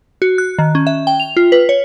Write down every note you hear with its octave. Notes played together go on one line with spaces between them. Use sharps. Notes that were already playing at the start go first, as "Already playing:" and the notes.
F#4
F#6
D#3
C#4
E5
G5
F7
F4
B4
C#5